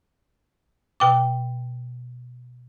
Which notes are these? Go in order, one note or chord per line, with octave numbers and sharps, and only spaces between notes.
B2 G5 D6